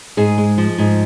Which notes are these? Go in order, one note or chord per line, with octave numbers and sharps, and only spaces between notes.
G#2 G#4
G#3
F3
G#2